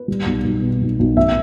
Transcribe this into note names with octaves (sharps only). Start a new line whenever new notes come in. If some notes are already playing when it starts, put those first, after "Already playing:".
Already playing: B4
G3
B1
B1
B2
B1
B1
A1 E5